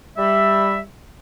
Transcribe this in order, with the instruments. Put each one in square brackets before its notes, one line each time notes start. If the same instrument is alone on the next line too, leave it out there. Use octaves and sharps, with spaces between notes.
[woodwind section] G3 E5